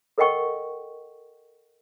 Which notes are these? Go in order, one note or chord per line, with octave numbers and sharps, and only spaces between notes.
A4 A#4 D#5 F#5 G5 C#6